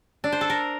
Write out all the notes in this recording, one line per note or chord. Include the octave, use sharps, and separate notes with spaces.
D4
C5
A4
A#4